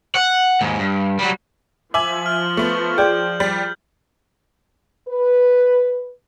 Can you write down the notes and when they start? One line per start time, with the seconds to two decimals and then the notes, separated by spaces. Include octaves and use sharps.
0.15 F#5
0.61 D#2 G#2
0.79 G2
1.19 F#3 G3
1.94 F3 E5 G#5 D6 F#7
2.26 F6
2.57 A3 B3
2.98 G#4 D5 G5 G6
3.40 G3
5.08 B4